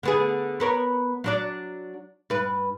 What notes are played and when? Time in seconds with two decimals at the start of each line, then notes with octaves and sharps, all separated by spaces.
0.03 D3 B3 G#4
0.60 B3 A#4 C#5
1.24 F#3 D4 D5
2.30 G2 B4